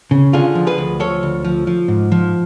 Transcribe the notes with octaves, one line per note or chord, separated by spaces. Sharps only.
C#3
D3 F4 G#4
F3
G#4 B4
D2
F3 A4 C#5
D2
F3
F3
G#2
F3